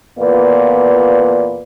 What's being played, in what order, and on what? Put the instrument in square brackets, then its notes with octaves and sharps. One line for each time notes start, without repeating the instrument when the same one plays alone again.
[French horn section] E2 A#2 B3 F4 B4 D5